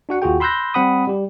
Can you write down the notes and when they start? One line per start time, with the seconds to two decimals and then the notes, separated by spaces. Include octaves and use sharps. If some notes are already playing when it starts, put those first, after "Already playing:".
0.09 D4 F#4 F#5
0.22 D#2 F4 F#4 G#4 G5
0.40 B5 C6 E6 F#6 G6 A#6
0.74 G3 C4 F#5 B5 D#6
1.07 G3 G4